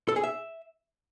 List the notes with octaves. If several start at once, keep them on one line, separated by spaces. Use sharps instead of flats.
A4
G#4
E5